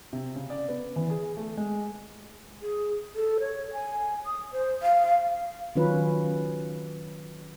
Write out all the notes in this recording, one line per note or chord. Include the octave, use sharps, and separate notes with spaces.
C3
C#3
D5
B3
E3
G#4
A3
G#3
G#4
A4
C#5
G#5
D#6
C5
F5
D#3 F#3 C#4 F4 B4